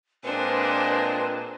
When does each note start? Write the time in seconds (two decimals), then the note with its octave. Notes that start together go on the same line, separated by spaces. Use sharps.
0.24 A#2 G#3 C4 D4 B4 C5